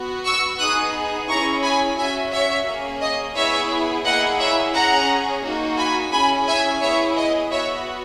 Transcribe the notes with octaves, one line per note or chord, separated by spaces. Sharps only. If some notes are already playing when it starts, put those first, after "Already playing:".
Already playing: B3 F#4
C#6 E6
B3 D#4 G#4 D#6 F#6
C#4 E4 G#4 A#5 C#6
G#5 B5
C#4 F#4 E5 G#5
C#5 E5
A#3 C#4 G#4
D#5
B3 E4 G#4 C#5 E5
A#3 E4 G#4 D#5 F#5
C#5 E5
C#4 G#4 F#5 A#5
A#3 D#4 F#4
G#5 B5
C#4 E4 G#4 G#5 B5
E5 G#5
B3 E4 G#4 C#5 E5
D#5
B3 F#4 C#5 E5